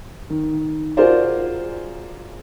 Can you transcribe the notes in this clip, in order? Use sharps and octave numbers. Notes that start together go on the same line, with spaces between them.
D#3
F4 F#4 G#4 A#4 C5 D5